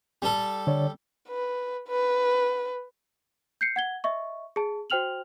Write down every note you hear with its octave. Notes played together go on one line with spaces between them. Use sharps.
G3 A4
D3 C#5 D5
B4
B4
G6 C7 C#7
F#5 G#6 G7
D#5 E5 C#6
G#4 A5
F#4 C5 G5 F6 F7 F#7